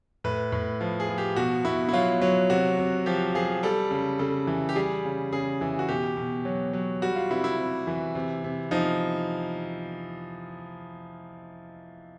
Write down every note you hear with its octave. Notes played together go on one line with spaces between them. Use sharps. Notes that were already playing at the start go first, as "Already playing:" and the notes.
A2 B4
A2
F3
G#4
F3
G4
B2 F#4
B2 E4
E4
F#3 F4
F#3
C3 F#4
C3
F3 G4
F3 G#4
G3 A4
C#3
C#3 A4
E3
G4
G3 G#4
C#3
C#3 G#4
E3
F#4
B2 G4
B2
F#3
F#3
G3 F#4
F4
C3 E4
E4
C3
E3
C3
C3
F3 D#4